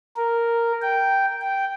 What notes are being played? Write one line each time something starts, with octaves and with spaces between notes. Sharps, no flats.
A#4
G5
G5